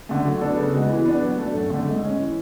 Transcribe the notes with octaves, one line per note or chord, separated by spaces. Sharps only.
D3 A3
F#3
B3 D4 A4
C#3
G#3 B3 F#4
E3
B3 D4
F#3
A3 D4 A4
F#2
D3 A3
G#2
G#3 C#4
E3